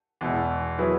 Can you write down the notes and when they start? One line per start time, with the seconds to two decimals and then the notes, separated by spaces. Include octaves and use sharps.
0.21 E2 B2 G#3 E4
0.78 F#3 E4 G#4 B4